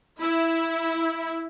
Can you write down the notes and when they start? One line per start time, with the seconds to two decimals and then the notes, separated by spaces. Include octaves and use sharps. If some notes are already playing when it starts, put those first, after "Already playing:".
0.20 E4